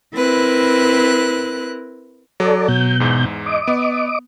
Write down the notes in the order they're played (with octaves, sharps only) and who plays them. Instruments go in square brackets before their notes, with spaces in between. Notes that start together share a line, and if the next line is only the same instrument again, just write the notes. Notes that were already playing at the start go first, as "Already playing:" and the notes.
[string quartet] C4 E4 A#4 B4 F#6
[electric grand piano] F#3 [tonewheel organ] A4 D5
[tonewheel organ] B2 G6
[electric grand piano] E2 G#2
[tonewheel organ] D#5 D6
[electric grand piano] B3